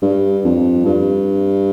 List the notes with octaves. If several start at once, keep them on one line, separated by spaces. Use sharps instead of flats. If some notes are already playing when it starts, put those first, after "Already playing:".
G2
F2
G2